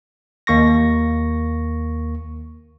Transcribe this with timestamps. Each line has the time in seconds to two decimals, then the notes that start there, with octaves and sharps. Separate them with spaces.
0.47 D#2 A#3 C#6 A#6